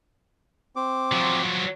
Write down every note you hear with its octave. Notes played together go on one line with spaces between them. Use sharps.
C4 D6
F3 F#3